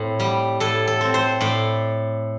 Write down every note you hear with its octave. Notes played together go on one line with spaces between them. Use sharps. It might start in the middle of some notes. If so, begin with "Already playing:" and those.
Already playing: A2 C4
G3
A2 A4
A4
C4
C5
A2 D5